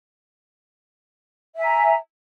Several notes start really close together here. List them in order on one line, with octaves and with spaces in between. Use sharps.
E5 G#5 A#5